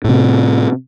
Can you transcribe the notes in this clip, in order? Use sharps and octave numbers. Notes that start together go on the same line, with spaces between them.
A2 C3